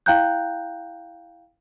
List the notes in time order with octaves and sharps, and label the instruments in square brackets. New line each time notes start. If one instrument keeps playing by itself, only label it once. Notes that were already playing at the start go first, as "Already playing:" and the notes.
[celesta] E4 F5 G5 A#5 F#6 G6